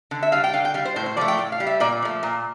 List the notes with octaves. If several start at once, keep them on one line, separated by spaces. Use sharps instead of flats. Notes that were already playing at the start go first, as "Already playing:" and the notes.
D3
E5
G3 F5
G5
D3 F5
G5
G3 F5
C5
A2 C5
C5
F3 A3 D5
G5
A2
F5
G3
E5
A#2 D5
F3 A3
A#2